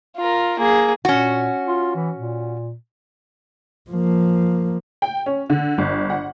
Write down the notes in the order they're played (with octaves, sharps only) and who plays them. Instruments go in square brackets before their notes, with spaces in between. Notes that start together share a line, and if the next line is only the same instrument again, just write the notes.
[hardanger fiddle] F4 A#4
A#3 G#4
[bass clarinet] A#2 [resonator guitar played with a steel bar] C#4 F#4
[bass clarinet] F4
E3
A#2
[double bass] F3 A#3
[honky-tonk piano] G5
C#4
D3
G1
F#5